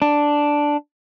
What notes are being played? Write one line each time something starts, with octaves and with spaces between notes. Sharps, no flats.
D4